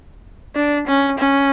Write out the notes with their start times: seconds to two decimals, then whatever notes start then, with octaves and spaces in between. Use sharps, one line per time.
0.55 D4
0.87 C#4
1.19 C#4